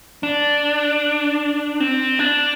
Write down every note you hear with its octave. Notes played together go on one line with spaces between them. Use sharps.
D4
C4
D4